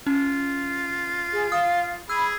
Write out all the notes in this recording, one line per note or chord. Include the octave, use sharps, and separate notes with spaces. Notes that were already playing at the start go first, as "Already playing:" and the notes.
C#4 F4
G#4
F5 D#6
G#4 B5 E6